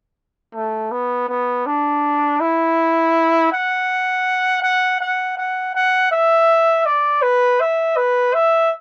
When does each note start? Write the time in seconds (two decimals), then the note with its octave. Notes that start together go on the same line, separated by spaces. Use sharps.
0.55 A3
0.92 B3
1.29 B3
1.66 D4
2.40 E4
3.52 F#5
4.63 F#5
5.00 F#5
5.37 F#5
5.75 F#5
6.11 E5
6.86 D5
7.22 B4
7.60 E5
7.96 B4
8.34 E5